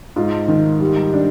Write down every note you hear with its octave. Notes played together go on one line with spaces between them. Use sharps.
G#2 F4
D#3
G3
D4